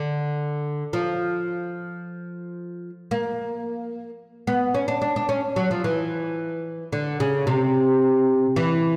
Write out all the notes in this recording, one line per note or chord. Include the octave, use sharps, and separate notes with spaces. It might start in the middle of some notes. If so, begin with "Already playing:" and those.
Already playing: D3
F3
A#3
B3
C#4
D4
D4
D4
C#4
F#3
F3
E3
D3
C#3
C3
E3